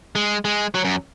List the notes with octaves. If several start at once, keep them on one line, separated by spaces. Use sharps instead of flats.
G#3
G#3
F#3
F#2